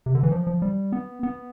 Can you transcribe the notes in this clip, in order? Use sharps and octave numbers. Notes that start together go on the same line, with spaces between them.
C3
D3
E3
F3
F3
G3
B3
B3